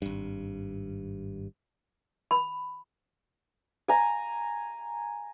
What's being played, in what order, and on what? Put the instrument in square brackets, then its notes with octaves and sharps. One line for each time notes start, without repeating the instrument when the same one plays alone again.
[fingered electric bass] G#1 G2
[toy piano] B5
[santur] G#5 A#5